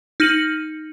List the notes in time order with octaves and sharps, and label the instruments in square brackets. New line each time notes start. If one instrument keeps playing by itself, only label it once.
[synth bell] D#4 F6 A#6 C#7 D#7 F#7